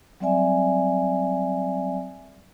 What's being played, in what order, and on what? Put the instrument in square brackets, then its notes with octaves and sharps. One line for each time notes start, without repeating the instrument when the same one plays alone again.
[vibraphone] F#3 G3 C4 D5 E5 G#5